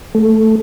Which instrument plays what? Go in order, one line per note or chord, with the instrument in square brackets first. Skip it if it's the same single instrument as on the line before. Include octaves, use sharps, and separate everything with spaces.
[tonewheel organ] A3